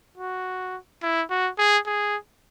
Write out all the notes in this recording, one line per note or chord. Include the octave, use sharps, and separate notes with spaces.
F#4
E4
F#4
G#4
G#4